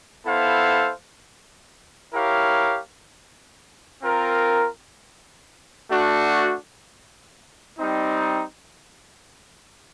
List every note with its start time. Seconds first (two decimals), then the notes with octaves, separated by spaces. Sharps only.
0.24 B3 E4 A4 C5 F5
2.13 E4 G4 A#4 C#5 F5
4.02 C4 F4 A#4
5.90 A3 D4 F#4
7.77 G3 C4 D#4